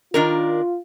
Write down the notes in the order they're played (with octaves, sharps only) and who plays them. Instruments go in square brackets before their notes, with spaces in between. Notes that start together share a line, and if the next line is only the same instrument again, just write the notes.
[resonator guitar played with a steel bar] D#3 D4 A#4 [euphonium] F4